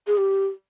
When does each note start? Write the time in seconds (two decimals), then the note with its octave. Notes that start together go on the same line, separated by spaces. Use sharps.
0.07 G#4
0.18 G4